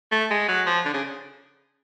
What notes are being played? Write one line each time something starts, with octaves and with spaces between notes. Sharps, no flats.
A3
G#3
F#3
F3
D3
C#3